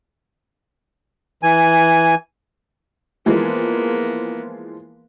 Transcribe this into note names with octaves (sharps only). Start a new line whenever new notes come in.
E3 G#5
E3 F3 G#3 A#3 B3